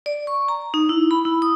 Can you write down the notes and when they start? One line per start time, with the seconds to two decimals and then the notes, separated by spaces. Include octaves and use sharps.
0.06 D5
0.27 C#6
0.48 A#5
0.74 D#4
0.89 E4
1.11 B5
1.25 E4
1.42 D#6